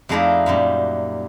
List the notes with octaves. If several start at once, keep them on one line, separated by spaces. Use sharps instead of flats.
F2 G#3 A3 D#4 E4 D5
F#2 A#2 G3